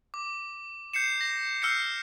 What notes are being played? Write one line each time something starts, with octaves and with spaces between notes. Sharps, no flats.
D6
G6 C7 C#7 E7
A#6
E6 F6 G6 C7 C#7